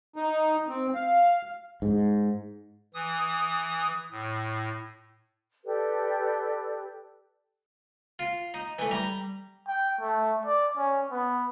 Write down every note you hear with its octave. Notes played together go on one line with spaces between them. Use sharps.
D#4
C4
F5
G#2
E3 D#6
A2
G4 A4 B4 D5
F4
D#4
E3 A3
G3 A#5
G5
A3
D5
C#4
B3